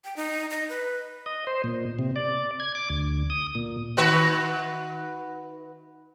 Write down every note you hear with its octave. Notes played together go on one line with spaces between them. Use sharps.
G5
D#4
D#5
B4
D#5
C5
A#2
C3
D5
G#6
D6
D2
D#6
A#2
D#3 F#4 B4